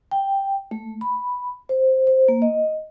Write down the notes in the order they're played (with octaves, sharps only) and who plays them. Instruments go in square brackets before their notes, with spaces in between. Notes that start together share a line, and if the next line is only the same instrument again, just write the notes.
[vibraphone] G5
A3
B5
C5
C5
A#3
D#5